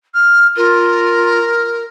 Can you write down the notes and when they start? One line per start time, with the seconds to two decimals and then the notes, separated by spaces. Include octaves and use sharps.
0.14 F6
0.57 F4 A#4